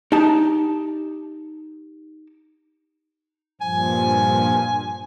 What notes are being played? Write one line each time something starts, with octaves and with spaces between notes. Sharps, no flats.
D#4 G4 A5
G2 A#2 F3 G#5